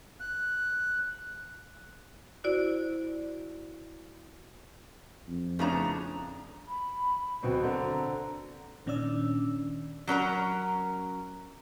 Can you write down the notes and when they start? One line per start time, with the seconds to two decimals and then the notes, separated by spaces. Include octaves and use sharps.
0.20 F#6
2.44 E4 F#4 C5 D5
5.28 F2
5.59 A2 C#3 F3 B3 D4 A#5
6.68 B5
7.43 D1 B2 C4 B4
7.63 D3 C4 A#5
8.86 A#2 D#3 C#4 D4 D5 E6
10.07 F#3 C#4 A#4 A#5